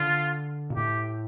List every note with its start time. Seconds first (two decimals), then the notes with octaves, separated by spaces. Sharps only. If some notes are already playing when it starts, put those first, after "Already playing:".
Already playing: D3 F4
0.70 A#2
0.76 A2 G4